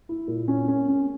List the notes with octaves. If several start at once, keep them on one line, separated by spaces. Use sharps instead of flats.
E4
A#2
C#4
C#4
C#4